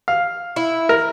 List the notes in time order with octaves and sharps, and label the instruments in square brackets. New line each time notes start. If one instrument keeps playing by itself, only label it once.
[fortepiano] F5
[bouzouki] E4
[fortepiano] A#4